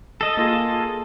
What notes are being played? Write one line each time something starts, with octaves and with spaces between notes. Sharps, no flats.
A4 D#5
A#3 F4 G#4